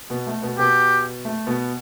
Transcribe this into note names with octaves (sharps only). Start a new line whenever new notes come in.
B2 B3
A3
B2 B3
B2 B3 G4
A3
B2 B3